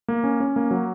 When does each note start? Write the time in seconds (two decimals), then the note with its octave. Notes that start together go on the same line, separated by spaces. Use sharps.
0.08 A#3
0.24 C#4
0.40 C#4
0.56 A#3
0.71 F#3